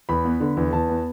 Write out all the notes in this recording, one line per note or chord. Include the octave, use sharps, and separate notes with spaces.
E2 B5
B3
D3
E2
E2 A5
B3